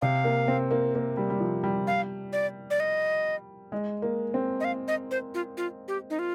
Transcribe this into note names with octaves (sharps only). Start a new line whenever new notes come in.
C3 F5
A#3
C4
A#3
A#3
G3
G3
F3
G3
F5
D5
D5
D#5
G#3
A#3
C4
D#5
F5
D#5
C5
F4
F4
G4
D#4
F4